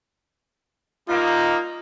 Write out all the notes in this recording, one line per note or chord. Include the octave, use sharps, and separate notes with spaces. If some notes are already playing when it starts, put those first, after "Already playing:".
G3 A#3 D#4 F4